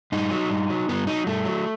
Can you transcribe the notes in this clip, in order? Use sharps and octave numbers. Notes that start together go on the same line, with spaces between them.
G2 D#4
F#3
G2
F#3
G2 B3
F#3 D#4
G2 A3
F#3